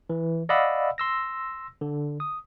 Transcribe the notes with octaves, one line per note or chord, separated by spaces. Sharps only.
E3
D5 D#5 F5 F#5 B5 E6
C6 E6 A#6
D3
D#6